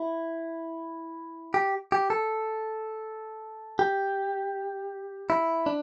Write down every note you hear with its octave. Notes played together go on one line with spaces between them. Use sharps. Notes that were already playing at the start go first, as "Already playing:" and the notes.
Already playing: E4
G4
G4
A4
G4
E4
D4